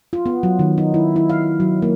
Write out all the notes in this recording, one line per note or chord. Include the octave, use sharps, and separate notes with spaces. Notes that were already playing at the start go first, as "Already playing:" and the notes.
F4
B3
F#3
D#3
D#4
E4
E4
F5
F#3
A#3